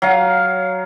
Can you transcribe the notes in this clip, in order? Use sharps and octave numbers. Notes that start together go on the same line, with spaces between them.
F#3 F5